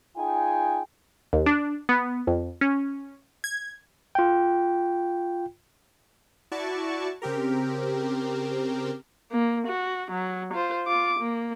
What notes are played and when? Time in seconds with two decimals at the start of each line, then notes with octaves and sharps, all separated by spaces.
0.16 D#4 F4 G#4 G5 G#5
1.33 D#2
1.46 D4
1.89 B3
2.27 F2
2.61 C#4
3.44 G#6
4.15 F4 G5
6.51 E4 F#4 D5 A5 C#6
7.22 C#3 C4 G4 A#4
9.31 A#3
9.67 F#4
10.11 F#3
10.54 F4 C5
10.86 F4 D6
11.20 A#3